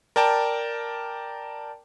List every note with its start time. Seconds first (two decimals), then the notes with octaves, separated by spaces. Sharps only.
0.16 A#4 D5 G5 A5